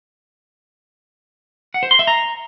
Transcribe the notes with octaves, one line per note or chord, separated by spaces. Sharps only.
F#5
C5
C6
E5
A#5